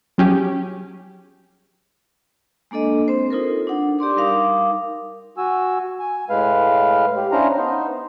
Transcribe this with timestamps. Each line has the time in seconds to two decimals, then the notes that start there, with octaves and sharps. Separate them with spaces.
0.18 F#3 C#4 G4 G#4
2.71 G#3 A#3 D4 A4 D#5
3.08 C4 C5
3.30 D#4 F4 A4 A#4
3.67 D4 D#4 F#5
3.99 G4 D5 C6 D6
4.16 G3 D#4 A#4 F5 D6 D#6
5.37 F#4 G#5 E6
5.99 G#5
6.30 A2 G#3 B4 F5
7.16 G4
7.32 C#4 D4 E4 C5 F5 A#5
7.57 B3 D#4 C5